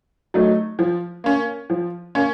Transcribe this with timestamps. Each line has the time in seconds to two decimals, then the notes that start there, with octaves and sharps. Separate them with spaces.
0.34 F#3 A3 D#4
0.79 F3
1.24 A#3 C#4
1.70 F3
2.15 A#3 C#4